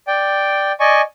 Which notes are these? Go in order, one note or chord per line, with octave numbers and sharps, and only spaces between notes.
D5 G5
D5 D#5 G#5 C#6